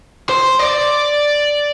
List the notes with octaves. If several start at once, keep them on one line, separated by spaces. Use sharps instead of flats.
C5
D5